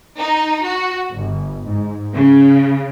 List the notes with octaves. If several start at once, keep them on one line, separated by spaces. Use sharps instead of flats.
D#4
F#4
G1
G#2
C#3